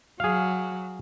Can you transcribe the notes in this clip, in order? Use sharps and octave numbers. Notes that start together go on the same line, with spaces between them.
F#3 G#4 F5